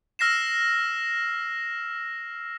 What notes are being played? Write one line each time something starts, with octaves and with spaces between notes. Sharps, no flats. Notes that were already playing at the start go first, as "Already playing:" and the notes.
E6 F6 A#6 C7 E7